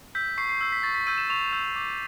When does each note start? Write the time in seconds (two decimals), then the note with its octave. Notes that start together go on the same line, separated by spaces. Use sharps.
0.15 E6 G6 B6
0.38 C#6 C7
0.49 C7
0.61 E6 G6
0.72 B6
0.83 C#6 A6
0.95 B6
1.07 E6 G6 D#7
1.18 E7
1.30 C#6 F7
1.53 E6 G6
1.76 D6